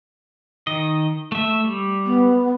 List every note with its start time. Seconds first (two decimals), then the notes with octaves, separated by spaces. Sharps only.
0.67 D#3 D#5
1.32 A3 E5
1.64 G3
2.06 B3